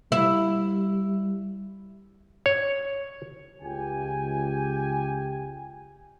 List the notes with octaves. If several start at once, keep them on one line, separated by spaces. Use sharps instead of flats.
G3 E4
C#5
C#2 G4 G5 G#5